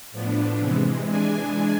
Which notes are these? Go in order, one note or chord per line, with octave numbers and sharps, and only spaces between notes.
A2 F3 B3 D4
C3 E3 G#3
E3 G#3 D4 G#5